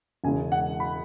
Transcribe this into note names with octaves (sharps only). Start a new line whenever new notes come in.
E1 E2 C#3 E3 G#3 G#5
F#5
B5